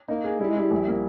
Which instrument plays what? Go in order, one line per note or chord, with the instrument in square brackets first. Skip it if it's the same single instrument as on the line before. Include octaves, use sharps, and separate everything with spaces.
[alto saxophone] A#3 [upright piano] D#4
[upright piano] G#4
[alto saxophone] G3 [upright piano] E4
[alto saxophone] G#3
[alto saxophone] G3 [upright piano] E4
[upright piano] A#1
A#3